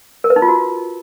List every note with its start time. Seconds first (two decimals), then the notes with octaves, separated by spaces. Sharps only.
0.24 A#4
0.30 B4
0.36 D#4
0.42 F4
0.48 F#4